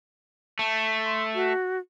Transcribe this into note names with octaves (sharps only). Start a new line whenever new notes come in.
A3
C6
F#4